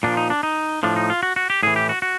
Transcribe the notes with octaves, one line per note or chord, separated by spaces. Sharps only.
A#2 F3 D4
D#4
D4
D#4
A2 F3 D4
D#4
F4
F#4
F#4
G4
A2 E3 G#4
G4
F#4
F#4